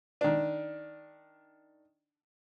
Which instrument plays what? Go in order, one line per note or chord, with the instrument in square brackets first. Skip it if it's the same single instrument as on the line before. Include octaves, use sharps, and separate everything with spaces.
[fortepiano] D#3 D4